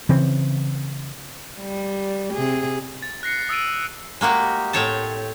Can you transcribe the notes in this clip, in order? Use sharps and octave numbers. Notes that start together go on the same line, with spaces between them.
C#3 E3 C4
G3
C3 G#4
A6
F#6 A#6 C7 C#7
D#6 E6 A6 D7 D#7
G#3 A#3 F#4 G4
A2 C4 C#5 G5 A5